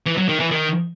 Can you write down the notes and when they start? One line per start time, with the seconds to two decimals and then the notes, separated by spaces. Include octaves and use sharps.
0.06 E3
0.17 F#3
0.29 D#3
0.40 E3
0.51 D#3